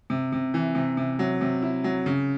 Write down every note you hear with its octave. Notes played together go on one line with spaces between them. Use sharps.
C3
C3
E3
C3
C3
F#3
C3
E4
F#3
C#3